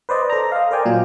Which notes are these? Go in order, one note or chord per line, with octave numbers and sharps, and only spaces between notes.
B4 C5 D5 D#5
A4 A#5
D#5 F5
A#4 C5 D5 G5 G#5
A#2 F#3 F4